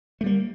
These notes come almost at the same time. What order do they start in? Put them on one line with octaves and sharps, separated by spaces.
A3 G3 A#3